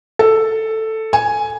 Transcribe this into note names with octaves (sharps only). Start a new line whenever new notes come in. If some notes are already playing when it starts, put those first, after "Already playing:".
A4
G#5